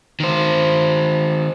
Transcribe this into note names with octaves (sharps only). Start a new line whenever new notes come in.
D#3 C5